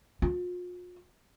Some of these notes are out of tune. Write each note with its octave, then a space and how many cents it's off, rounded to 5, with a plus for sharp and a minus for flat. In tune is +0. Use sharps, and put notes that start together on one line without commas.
F4 +40